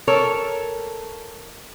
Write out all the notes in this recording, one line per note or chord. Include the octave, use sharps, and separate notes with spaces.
A4 A#4 C#5